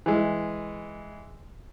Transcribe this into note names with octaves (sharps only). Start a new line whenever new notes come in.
E3 G#3